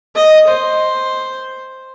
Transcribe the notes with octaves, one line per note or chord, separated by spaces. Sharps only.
D#5
C5